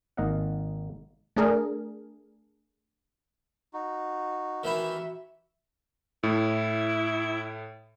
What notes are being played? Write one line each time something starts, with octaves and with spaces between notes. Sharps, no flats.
G#1 A#3 D#4 D#5 F5 F#5
A3 D4 G#4 A#4
D#4 F#4
D#3 E3 E4 F#4 E5
A2 E4